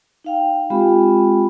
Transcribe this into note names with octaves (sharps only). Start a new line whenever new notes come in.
D#4 F5 G5
G#3 C4 F4 G4 G5 B5